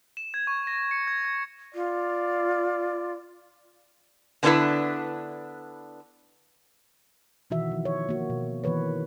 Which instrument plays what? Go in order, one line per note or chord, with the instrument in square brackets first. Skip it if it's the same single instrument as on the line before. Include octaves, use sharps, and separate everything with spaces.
[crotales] E7
G#6
C#6
A#6
C#7
G#6
G#6
[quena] F4 [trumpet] D5
[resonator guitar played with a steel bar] D3 B3 C#4 D4 E4 B4
[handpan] B2 D#3 E3 F#4 E5
F3
C#5
A#3 F#4
B2
D#3 E3 A#3 B4 C#5